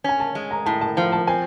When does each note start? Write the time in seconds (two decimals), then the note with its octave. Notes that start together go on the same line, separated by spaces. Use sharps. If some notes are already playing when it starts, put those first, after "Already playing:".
0.04 C#4 G#5
0.20 A5
0.35 G#3
0.51 A#5
0.66 A2 A5
0.81 A5
0.97 F3 A5
1.12 A5
1.27 C4 G#5